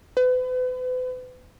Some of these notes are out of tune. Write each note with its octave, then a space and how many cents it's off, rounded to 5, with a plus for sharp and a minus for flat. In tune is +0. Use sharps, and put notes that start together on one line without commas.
B4 +40